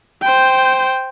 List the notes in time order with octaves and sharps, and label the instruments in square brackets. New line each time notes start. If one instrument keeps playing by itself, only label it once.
[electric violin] C5 G5